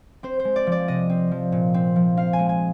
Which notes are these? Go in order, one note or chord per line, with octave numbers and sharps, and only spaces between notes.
C4 C5
C5
G#3
D5
F3
D5
C3 D#5
C4
F3
A#2
C4
F3
C4 F5
G#5
G#3
G#5